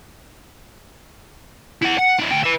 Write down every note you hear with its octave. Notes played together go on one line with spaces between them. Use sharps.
E4 F#5
F#5
D4 E4
D2 G5
B4 E5